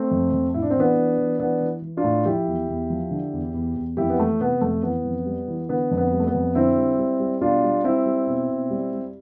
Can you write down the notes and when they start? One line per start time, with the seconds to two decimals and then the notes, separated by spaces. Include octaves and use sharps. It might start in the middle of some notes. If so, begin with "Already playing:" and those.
Already playing: A3 C4
0.11 F2
0.32 F2
0.54 A2 E4
0.62 D4
0.70 C4
0.76 E3 B3 D4
0.97 E3
1.18 E3
1.39 E3 B3 D4
1.61 E3
1.82 E3
1.97 D4 F4
2.03 A2
2.25 F3 E4 G4
2.47 E2
2.68 E2
2.90 F3
3.11 D3
3.33 E2
3.54 E2
3.76 E2
3.97 F2 E4 G4
4.10 B3
4.19 E3 A3
4.40 C3 B3
4.61 F2 A3
4.83 E3 B3
5.05 F2
5.26 G3
5.48 E3
5.69 D3 B3
5.91 F2
5.97 B3
6.12 G3
6.20 A3
6.27 B3
6.34 F2
6.55 D3 C4 E4
6.77 G3
6.98 G3
7.20 G3
7.41 B2 D4 F4
7.63 G3
7.84 G3 C4 E4
8.06 G3
8.27 B2
8.49 B2
8.70 G3
8.92 G3